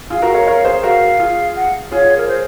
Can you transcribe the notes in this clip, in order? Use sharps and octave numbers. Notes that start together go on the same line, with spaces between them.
F4 G#4 F5
F#4 A#4
A#4 C#5
A#4 C#5
G#4 C5
F#4 A#4 F5
F4 G#4
F#5
F4 G#4 C#5
A#4
C5